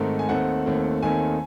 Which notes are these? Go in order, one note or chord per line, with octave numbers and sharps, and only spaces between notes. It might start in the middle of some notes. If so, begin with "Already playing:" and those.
Already playing: G#2 D#3 A3 C4
G#5
D#2 D#3 A3 C4 F#5
D#2 D#3 A3 C4
D#2 D#3 A3 C4 G#5